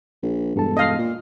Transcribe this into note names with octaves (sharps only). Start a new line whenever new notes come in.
A#1
E1 G2 A4 A5
D#5 F5
A#2